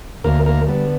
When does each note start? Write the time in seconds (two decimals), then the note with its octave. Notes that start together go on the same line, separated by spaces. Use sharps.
0.24 D2 A#3 A#4
0.46 A#3 A#4
0.67 D3 G3 B3